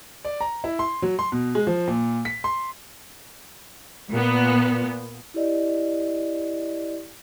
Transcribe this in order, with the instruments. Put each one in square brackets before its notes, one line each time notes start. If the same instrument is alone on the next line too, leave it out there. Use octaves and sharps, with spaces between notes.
[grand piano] D5
A#5
E4
C6
F#3
C6
B2
G#3
F3
A#2
B6
C6
[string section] A#2 B3
[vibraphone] E4 G4 D5 D#5